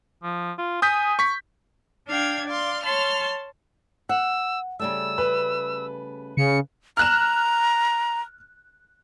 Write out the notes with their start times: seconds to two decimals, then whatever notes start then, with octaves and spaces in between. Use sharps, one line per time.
0.24 F3
0.58 F4
0.82 G#5 D#6 G6 B6
1.19 C#6 B6
2.09 D4 F5 G5 G#6
2.47 D5 F5 C6
2.84 C#5 A5 C6 F6
4.09 F#5 E6
4.80 C#3 G3 A3 E6
5.18 B4
6.37 C#3 C#7
6.97 A#5 F6 F#6 E7